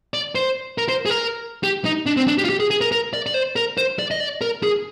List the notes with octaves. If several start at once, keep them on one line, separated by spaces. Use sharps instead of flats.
D5
C5
A#4
C5
G#4
A#4
G4
D#4
D4
C4
D4
G4
F4
G4
G#4
G#4
A#4
A#4
D5
D5
C5
A#4
C5
D5
D#5
D5
A#4
G#4